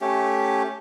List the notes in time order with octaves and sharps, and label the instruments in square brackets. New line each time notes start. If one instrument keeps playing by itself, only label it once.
[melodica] A3 C#4 G4